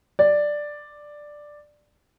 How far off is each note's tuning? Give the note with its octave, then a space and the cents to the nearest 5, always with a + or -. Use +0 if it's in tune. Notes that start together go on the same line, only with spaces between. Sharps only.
D5 +5